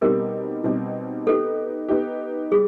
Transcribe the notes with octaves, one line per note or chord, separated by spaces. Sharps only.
B2 G3 C4 D#4 G4 A#4
B2 G3 C4 D#4 G4
B3 D#4 G4 A4
B3 D#4 G4
G3 G#4